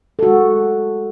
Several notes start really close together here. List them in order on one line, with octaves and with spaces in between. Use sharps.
A4 F#4 G#3